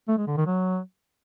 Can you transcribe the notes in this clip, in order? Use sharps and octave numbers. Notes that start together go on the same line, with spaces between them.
A3
G#3
D3
D#3
F#3